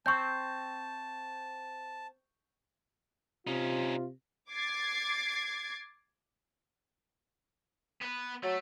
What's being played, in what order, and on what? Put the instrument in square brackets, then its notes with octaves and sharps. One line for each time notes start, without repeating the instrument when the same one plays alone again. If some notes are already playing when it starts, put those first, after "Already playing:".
[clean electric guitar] C4 [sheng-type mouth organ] A5 [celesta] C#6 G6
[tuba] C3 [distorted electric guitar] C#4 D#4 [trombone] F4
[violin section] D6 G#6 A6 C7
[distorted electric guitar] B3 B4
[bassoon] F#3 [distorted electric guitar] A3